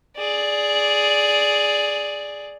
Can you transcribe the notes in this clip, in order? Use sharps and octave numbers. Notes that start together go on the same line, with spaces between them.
G#4 D5